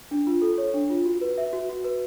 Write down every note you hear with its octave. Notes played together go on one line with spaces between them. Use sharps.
D4
F4
A4
C#5
D4
F4
F#4
B4
E5
F#4
F#4
B4